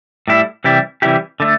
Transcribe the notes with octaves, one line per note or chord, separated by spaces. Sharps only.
A2 G3 E4
C3 E3 G3 E4 G4
C3 E3 G3 E4 G4
D3 A3